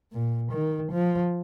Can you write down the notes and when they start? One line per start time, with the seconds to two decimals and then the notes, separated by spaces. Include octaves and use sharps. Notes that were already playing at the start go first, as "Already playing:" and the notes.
0.12 A#2
0.52 D#3
0.91 F3